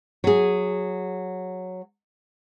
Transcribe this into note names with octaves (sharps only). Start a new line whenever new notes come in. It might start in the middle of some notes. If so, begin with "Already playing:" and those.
F#3 G#4